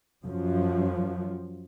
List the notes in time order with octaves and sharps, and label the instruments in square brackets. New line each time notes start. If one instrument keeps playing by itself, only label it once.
[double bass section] F#2 F3